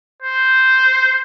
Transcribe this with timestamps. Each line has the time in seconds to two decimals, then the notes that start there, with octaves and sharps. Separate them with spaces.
0.22 C5